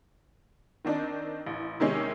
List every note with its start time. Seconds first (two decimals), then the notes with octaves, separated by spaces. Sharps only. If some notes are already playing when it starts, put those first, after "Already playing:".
0.85 D#3 C4 D4 D#4
1.47 A1
1.80 C3 D#3 G#3 C#4